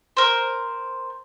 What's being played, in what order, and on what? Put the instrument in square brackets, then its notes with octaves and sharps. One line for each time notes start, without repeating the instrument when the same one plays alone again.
[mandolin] A#4 C5